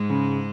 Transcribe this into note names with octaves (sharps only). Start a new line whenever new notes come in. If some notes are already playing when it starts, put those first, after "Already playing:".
Already playing: G#2 G#3
C#3